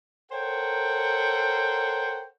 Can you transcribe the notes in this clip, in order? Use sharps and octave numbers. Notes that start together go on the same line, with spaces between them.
A4 A#4 C5 C#5 F#5 G5